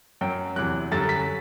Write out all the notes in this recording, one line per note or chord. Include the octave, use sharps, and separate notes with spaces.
F#2 F#3 G5
E2 C3 F#3 F#6
F#2 D3 G3 A6
B6